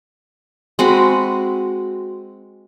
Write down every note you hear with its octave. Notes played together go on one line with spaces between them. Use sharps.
G#3 C4 F#4 B5